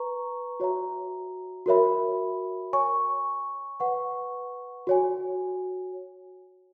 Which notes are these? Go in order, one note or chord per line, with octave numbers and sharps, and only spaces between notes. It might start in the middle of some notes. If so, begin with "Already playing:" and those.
Already playing: B4 A#5 C#6
F#4 C#5 E5 A#5
F#4 A#4 C#5 E5 B5
C#5 G#5 C#6
B4 F#5 C#6
F#4 C#5 G#5